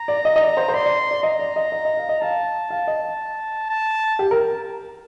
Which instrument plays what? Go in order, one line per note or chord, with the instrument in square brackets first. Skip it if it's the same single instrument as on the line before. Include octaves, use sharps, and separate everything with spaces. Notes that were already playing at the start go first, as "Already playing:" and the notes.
Already playing: [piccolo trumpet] A#5
[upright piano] D5
D#5
D#5
D5
C5
C5
[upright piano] D5 [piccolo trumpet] C6
[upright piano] D5
D5
[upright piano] D#5 [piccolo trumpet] A#5
[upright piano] D5
D#5
D#5
D#5
F5
D#5
[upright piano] F5 [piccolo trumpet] A5
[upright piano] F5
D#5
[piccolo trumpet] A5
[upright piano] G4
A#4